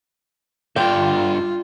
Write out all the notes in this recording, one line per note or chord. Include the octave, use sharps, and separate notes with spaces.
G2 D3 F4 G5